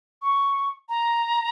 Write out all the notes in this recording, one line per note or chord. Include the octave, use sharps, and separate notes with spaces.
C#6
A#5